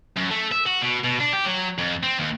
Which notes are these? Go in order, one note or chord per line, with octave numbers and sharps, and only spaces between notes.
F#2
A3
E5
F#4
B2
B2
D4
G4
F#3
F2
C4
D#2